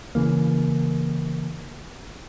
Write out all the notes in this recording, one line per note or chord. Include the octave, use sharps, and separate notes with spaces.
C#3 E3 A#3